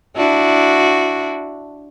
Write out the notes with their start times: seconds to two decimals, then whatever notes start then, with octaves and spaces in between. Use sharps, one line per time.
0.17 D4 E4 F#4